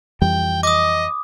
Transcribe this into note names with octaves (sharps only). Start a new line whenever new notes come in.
F2 E3 G3 G5
D#5 D6 D#6